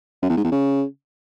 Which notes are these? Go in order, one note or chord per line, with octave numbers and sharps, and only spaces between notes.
F#2
E2
G#2
E2
C#3